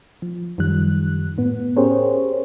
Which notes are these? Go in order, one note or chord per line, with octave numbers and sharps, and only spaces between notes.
F3
F#2 D#3 F3 G3 F#6
A2 B3
C#4 G4 G#4 A#4 C5 C#5